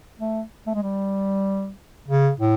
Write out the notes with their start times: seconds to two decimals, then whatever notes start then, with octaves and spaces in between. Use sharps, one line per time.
0.20 A3
0.67 A3
0.75 G#3
0.83 G3
2.08 C#3
2.40 A2